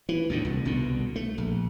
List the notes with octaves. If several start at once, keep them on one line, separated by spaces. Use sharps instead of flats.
E3
D2 A2 D3
C2
C2 B2 D3
A3
A#1